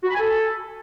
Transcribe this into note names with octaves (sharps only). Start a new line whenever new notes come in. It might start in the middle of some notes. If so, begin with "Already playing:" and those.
F#4
B5
G#5
A4